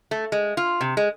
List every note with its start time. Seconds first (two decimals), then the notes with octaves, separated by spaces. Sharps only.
0.11 A3
0.32 G#3
0.57 F4
0.81 C3
0.97 G#3